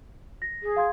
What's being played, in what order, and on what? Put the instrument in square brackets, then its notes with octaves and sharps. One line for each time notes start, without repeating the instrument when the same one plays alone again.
[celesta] A#6
[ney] G#4
[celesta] F5 C6 G#6